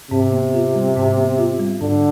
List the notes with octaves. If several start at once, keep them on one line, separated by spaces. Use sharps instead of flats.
G#2 C3
B3
F4
G3
G#2
B3
F4
G3
G#2 D3